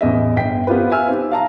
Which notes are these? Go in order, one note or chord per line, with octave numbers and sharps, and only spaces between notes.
A1 E2 D#5 E5
G1 G5 B6
B3 C4 F4 G4 A#4 B4
E5 F5 G#5 E6 F6
C4 D#4 G4
F5 A5 A#5